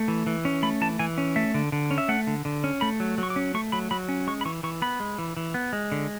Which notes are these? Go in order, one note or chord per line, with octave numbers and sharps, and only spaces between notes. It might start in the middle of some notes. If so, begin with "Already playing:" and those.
Already playing: A3
E3
E3
C#4
A3 B5
E3 A5
E3 G#5
C#4
A3 E5
D3
D3
C#4
E5
A3 F#5
D3
D3
C#4
A3 B5
F#3
F#3
C#6
D6
C#4
A3 C#6
F#3 B5
F#3 B5
C#4
G#3 C#6
B5
E3 C#6
E3 C#6
B3 B5
G#3
E3
E3
B3
G#3
D3